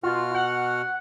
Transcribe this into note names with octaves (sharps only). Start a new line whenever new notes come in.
B2 F4 F#4 F6
F#5